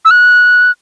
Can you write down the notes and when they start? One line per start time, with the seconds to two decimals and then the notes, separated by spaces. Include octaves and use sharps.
0.05 E6
0.11 F#6